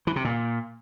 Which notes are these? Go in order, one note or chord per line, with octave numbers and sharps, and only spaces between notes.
E3
C3
A#2